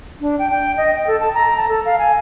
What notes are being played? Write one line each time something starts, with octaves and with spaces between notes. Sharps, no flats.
D4
G5
G5
D#5
G5
A4
A5
A#5
A5
A4
F5
G#5